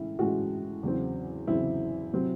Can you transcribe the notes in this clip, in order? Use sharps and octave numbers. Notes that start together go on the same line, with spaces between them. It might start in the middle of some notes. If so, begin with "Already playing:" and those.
Already playing: A2 E3 G#3 C#4 E4
A2 E3 G#3 C#4 F#4
E2 C#3 F#3 C4
E2 C#3 F#3 C4 E4
C3 F#3 C4